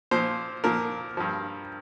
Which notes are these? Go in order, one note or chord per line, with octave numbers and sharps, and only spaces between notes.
A#2 F3 C5
A#2 F3 A#4
G2 F3